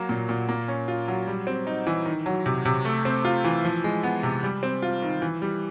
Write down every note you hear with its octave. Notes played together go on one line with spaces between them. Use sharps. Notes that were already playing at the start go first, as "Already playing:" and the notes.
Already playing: F#3 A#3
A#2
A#2
A#3
C#4
F4
F#3
G3
C4
D#4
E3
D#3
F#3
C3
C3
A3
C4
F4
E3
F3
G#3
B3
C3
G3
C4
F4
D#3
E3
G3